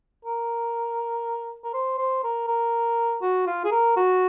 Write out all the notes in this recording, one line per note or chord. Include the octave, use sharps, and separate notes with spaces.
A#4
A#4
C5
C5
A#4
A#4
F#4
F4
G#4
A#4
F#4